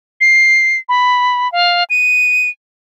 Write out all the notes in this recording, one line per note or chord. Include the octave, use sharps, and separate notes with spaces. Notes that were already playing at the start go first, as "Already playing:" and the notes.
C7
B5
F5
D#7